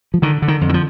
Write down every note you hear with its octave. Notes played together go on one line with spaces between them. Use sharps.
F3
D3 D#3
D3
D#3
F2
D#3
F3